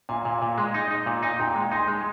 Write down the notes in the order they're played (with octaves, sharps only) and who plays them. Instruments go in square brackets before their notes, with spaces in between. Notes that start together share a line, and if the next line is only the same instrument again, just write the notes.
[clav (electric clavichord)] A#2 [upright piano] F5 G#5
[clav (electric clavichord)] A#2
A#2
G#3
D#4
D#4
A#2
D#4
[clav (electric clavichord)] A#2 [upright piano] G5 A#5
[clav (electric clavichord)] G#3
[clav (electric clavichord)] D#4 [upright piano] G#5 C6
[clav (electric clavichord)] G#3